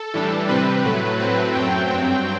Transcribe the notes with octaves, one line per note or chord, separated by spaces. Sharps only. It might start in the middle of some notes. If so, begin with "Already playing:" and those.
Already playing: A4
A2 E3 G3 D4
C3 G3 C4 B4
A2 F#3 A3
A2 F#3 A3 C4
F#2 F#3 A3 C4 G5
G2 F#3 C4